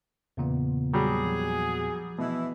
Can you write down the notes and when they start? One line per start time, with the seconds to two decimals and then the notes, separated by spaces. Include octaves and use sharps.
0.37 E2 A#2 C#3 B3
0.93 F#3 G3 F#4 G#4
1.25 F3
2.18 B2 E3 E4